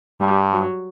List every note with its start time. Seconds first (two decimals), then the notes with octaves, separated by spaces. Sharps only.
0.21 G2 G3
0.53 F#3